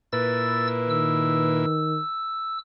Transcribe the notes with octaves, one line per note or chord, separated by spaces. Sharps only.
A#2 E4 B4 E6 A6
D#3 E6